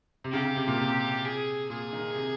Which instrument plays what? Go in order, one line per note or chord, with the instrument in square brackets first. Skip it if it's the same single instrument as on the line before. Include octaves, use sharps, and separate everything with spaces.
[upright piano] C3
[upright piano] C#3 [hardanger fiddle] G4
[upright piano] C#3
C3
A#2
C3
[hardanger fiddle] G#4
[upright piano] A#2 [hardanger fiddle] G#4
[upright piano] D#3
C3